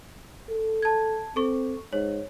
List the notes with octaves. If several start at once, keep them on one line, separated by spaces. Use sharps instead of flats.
A4
A5 G#6
C4 A4 C#6
G#2 C#5